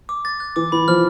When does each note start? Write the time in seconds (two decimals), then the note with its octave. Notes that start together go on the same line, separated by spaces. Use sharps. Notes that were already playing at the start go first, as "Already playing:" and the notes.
0.09 D6
0.25 A6
0.40 F#6
0.56 E3 D6
0.72 E3 B5
0.88 F3 F6